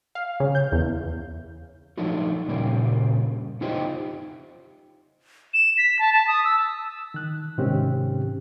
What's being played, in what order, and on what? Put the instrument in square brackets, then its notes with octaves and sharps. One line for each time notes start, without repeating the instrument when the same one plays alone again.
[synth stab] F5
C#3
G6
E2
[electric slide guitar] F3 F#3 A3 D4 D#4 F#4
A#2 C#3 G3 A#3
D#4 F4 G4 C5 D#5
[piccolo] E7
B6
A5
A5
D#6
E6
[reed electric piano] D#3 F#6
G#2 C3 D#3 C4 C#4 G4